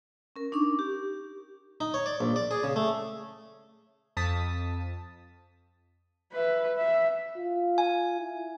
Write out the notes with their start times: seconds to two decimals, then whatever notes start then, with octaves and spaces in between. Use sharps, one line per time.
0.36 C#4 A#4
0.52 D4 D#4 C#6 D6
0.79 G4
1.80 D#4
1.94 C#5
2.06 D5
2.21 A#1
2.36 D5
2.51 G#4
2.63 C#3
2.76 A3
4.17 F2 A5 D#6 A6 B6
6.33 B4 E5
6.76 E5
7.37 F4
7.78 G#5
8.20 E4